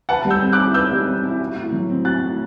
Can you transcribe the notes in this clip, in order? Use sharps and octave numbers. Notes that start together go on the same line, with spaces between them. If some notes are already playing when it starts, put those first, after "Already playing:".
B4 F#5 A5
G3
E6 G6
C4
D6 F#6
E4
B4 E6 G6
G3
C4
E4
F#4
A2
F#3
C4
F#4 F#6 A6
A2